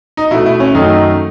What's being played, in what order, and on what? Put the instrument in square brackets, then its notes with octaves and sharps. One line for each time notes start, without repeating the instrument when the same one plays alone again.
[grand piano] D#4
B2 A3 E4
E4
C#4
F#2 D#3 A3 D#4